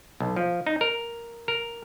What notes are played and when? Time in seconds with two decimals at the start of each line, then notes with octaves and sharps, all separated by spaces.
0.20 B1
0.36 F3
0.67 D#4
0.81 A#4
1.48 A#4